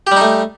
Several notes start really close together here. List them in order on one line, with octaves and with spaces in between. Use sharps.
G4 G3 D#4 A3